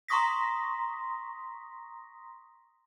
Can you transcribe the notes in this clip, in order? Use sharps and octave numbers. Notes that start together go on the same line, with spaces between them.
A#5 C6 C#6 D#6 A#6 B6